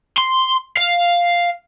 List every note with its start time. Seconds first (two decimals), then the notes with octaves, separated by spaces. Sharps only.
0.18 C6
0.77 F5